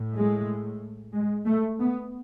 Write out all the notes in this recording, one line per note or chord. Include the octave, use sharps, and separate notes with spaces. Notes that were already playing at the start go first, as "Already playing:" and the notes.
Already playing: A2
G#3
G#3
A3
B3